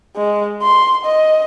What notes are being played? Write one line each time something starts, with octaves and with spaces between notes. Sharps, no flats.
G#3
C6
D#5